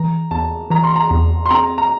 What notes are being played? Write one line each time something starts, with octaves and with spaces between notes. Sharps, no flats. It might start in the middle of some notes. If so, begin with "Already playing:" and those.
Already playing: E3 A#5
E2 A5
E3 A#5
C6
A#5
E2
C6
C4 A#5
A#5